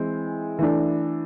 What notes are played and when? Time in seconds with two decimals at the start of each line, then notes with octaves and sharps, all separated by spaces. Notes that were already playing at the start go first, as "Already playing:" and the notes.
Already playing: E3 G#3 C4
0.59 E3 A3 D4